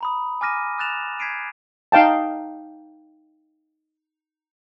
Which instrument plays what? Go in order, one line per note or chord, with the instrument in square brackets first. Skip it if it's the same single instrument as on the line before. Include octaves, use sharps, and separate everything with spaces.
[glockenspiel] A#5 B5 D#6
G#5 D6 F6 A#6 D#7
D#6 F6 F#6 A6 E7 F7
G6 G#6 B6 C7 D7 D#7
[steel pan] D#4 F5 G5 A5